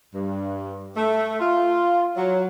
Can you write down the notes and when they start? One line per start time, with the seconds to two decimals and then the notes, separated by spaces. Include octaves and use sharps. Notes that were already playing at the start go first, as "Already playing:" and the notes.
0.13 G2
0.96 A3
1.40 F4
2.15 F#3